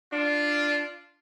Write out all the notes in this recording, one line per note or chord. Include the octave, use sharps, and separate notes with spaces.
D4 F4